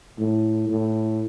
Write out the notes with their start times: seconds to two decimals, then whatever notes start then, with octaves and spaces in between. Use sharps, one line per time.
0.19 A2
0.69 A2